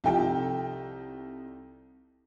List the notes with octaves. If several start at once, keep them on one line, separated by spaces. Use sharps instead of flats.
C2 F3 D#4 A4 G5